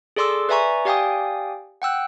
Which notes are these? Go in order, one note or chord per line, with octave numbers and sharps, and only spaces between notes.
G#4 A4 D5 C6 D6 E6
B4 D5 E5 G#5 A#5 C#6
G4 D5 F5 G5 G#5 D#6
F#5 G5 E6 F#6